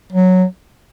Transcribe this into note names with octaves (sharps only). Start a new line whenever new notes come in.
F#3